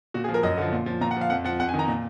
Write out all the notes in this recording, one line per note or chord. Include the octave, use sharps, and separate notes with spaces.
A#2 F#4
G#4
F3
A#4
F#2 D#5
D3 F3
A#2
F3
A#2 A#5
F#5
F3 F5
F2 F#5
F3 F#5
F2 F#5
G#5
D#3
A#5
A#2